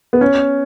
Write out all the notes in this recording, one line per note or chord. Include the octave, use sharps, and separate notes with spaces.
B3
C#4